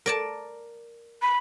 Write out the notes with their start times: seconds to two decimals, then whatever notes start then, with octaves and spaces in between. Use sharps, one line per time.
0.06 A#4 D5 A5
1.22 B5